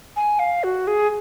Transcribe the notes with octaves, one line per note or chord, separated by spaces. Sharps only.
G#5
F5
F#4
G#4